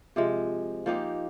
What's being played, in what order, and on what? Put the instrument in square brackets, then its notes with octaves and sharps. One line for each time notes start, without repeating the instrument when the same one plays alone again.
[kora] C3 F3 G#3
F3 A#3 D#4 G4